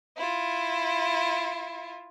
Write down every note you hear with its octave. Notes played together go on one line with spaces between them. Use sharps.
E4 F4